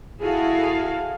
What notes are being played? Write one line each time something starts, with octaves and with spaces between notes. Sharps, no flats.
E4 F#4 G#4 A4 F5